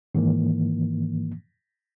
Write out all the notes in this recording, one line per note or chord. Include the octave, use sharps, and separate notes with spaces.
G#2 D#3 E3 A#3